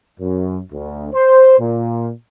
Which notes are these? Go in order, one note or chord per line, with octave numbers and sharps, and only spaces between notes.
F#2
D2
C5
A#2